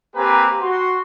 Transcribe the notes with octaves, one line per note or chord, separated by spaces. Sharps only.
A#3 C4 G4 B4 G#5 A#5
F#4 C6